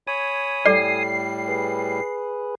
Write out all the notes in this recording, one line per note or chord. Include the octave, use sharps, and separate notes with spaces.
C#5 G#5 B5 D#6
A2 G3 A4 D5 C7
G#4 B4